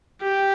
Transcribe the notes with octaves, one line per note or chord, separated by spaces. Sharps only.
G4